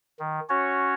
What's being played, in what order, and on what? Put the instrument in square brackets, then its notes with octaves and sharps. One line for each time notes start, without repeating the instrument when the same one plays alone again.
[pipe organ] D#3
C#4 F#4 C#5